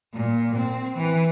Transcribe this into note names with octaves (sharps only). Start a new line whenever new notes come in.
A#2
C4
E3